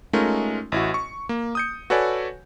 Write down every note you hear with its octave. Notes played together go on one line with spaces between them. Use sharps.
G#3 A3 C#4 D#4 F4 A#4
A1 E4 F#4
C#6
A#3
D#6 G6 C#7
F#4 A4 B4 C#5 D5 G#5